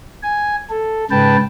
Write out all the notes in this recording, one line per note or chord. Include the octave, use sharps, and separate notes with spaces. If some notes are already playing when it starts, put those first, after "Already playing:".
G#5
A4
G#2 C#3 B4 G5 A5